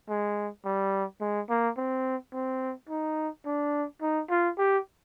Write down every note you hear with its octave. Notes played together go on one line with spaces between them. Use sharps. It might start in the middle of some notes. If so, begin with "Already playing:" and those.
G#3
G3
G#3
A#3
C4
C4
D#4
D4
D#4
F4
G4